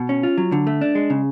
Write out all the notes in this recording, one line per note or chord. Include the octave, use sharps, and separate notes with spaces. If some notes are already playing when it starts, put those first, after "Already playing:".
Already playing: B2
C#4
F4
F#3
D3
A3
D4
G#3
C#3